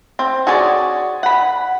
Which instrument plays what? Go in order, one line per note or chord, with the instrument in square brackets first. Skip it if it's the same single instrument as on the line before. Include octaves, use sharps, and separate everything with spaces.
[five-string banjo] C4
F#4 G#4 C#5 D5
F#5 B5